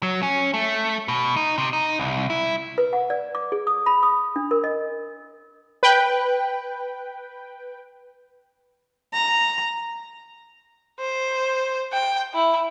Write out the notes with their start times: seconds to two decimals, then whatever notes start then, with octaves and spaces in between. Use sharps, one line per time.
0.03 F#3
0.23 C#4
0.54 A3
1.08 B2
1.36 D#4
1.58 C3
1.73 D#4
2.00 C2
2.30 E4
2.78 B4
2.93 F#5
3.10 D5
3.35 D6
3.52 G#4
3.67 D#6
3.86 B5
4.03 D#6
4.36 D4
4.51 A#4
4.64 D#5
5.83 B4 G5
9.14 A#5
11.00 C5
11.93 G5
12.34 E4